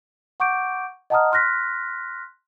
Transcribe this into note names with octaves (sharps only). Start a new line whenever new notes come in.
F#5 C#6 D6 G6 D7
D#5 F#5 A5 A#5 D#6 F6
C6 F6 F#6 A#6 B6